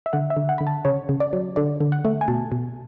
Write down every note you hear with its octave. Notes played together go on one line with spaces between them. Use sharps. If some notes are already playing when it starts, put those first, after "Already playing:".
E5
D3 F#5
E5
D3
F#5
D3 B5
A5
C#3 C#5
C#3
D5
F#3
D3 D5
D3
F#5
A3
G#5
B2 A5
B2